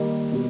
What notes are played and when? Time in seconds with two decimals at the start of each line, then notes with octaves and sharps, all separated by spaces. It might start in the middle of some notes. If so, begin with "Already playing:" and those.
Already playing: D#3 G3 A#3 D#4
0.32 B2 G3